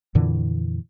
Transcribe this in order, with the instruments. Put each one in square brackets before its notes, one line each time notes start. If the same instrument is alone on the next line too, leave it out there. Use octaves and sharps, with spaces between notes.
[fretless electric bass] F2 A#2 D3 E3